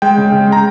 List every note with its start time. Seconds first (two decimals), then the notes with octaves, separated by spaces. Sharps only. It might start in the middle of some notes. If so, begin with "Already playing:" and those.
0.02 G#3 G5
0.18 C#3
0.32 C#3
0.47 G#3
0.52 A#5